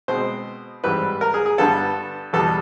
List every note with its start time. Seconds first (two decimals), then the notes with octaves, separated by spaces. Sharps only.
0.08 B2 G#3 C4 C5
0.84 G#2 E3 G3 C4 B4
1.21 A#4
1.34 G#4
1.46 G#4
1.58 G2 D3 G3 B3 A4
2.33 E2 B2 G3 B3 A4